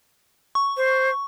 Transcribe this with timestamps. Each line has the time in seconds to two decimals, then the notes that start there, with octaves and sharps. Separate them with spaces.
0.55 C#6
0.77 C5